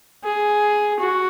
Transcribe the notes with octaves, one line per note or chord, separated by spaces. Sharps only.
G#4
F#4